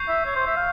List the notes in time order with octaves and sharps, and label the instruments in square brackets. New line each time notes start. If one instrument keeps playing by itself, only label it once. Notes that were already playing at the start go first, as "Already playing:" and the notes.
Already playing: [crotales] C#6 G6 C7 F7
[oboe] E5
C#5
C5
E5
F5